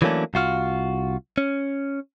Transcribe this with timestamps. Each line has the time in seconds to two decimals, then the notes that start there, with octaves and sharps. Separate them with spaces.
0.02 E3 F#3 A3 A#3 C#4 D4
0.34 C2 F4 F#4 F5
1.38 C#4